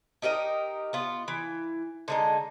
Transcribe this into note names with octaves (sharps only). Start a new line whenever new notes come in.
D#4 G4 A#4 D#5
B3 F4
E3
D3 G#3 D#4